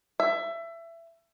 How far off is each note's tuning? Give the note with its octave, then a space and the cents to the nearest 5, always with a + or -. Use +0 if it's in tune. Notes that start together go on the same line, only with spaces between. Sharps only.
E5 +20